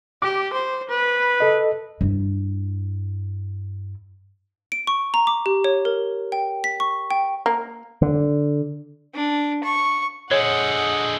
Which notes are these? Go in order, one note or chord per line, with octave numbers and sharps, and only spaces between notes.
G4 D6
C5
B4
A4 D#5
G2 E4
D7
C#6
A#5
D6
G4
C#5
A#4
G5
B6
C#6
G5
A#3
D3
D4
C#6
A#2 D3 G#4 C#5 D#5 F#5 G6